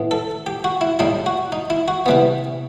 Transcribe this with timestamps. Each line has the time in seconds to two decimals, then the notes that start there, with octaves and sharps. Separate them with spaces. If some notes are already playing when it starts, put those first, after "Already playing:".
Already playing: A2 E3 B3
0.11 A4
0.46 G4
0.64 F#4
0.81 E4
0.99 A2 G3 D#4 E4
1.26 F#4
1.52 D#4
1.70 E4
1.88 F#4
2.06 C3 E3 G3 B3